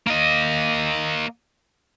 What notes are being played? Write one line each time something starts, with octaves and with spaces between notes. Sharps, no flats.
A#3 D#5